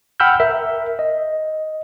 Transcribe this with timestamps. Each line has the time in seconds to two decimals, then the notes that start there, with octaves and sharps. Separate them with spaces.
0.20 F#5 G5 B5 E6 F6 G6
0.40 A#4 E5
0.99 D#5